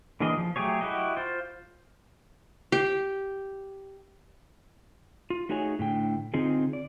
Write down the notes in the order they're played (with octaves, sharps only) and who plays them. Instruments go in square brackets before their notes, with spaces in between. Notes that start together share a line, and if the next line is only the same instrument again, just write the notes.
[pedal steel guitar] D3 E3 A#3 G#4 D#5
F3
F#3 A3 G4 G#4 C#5
E4 F#4 G4 D#5
F4 C5
[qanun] G4
[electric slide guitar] F4
A3 D#4 F#4 G#4 C#5 G#5
A2 D3 G5
D3 C4 D#4 F4 G#4
D5